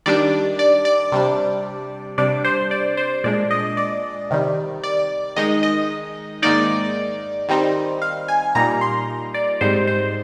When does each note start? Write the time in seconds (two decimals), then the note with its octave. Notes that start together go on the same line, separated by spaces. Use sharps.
0.06 D#3 G3 D4 D5
0.59 D5
0.85 D5
1.12 C3 G3 D4
2.18 C3 G3 D4 D5
2.44 C5
2.71 D5
2.97 C5
3.24 A#2 G#3 D4 D5
3.51 D#5
3.77 D5
4.30 C3 D#3 G3
4.83 D5
5.36 D#3 G#3 D#4 D#5
5.63 D#5
6.42 G#2 D#3 A#3 D#4 D5
7.49 D#3 G3 C4 D#4
8.02 F5
8.28 G#5
8.55 A#2 G3 A#3 D#4 A#5
8.81 C6
9.34 D5
9.61 G#2 G3 C4 D#4 C5
9.87 C5